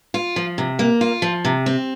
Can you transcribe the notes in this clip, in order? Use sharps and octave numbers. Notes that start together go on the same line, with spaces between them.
F4
F3
C3
A#3
F4
F3
C3
C4